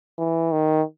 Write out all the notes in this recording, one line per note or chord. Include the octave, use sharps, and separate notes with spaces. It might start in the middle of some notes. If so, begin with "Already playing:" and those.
E3
D#3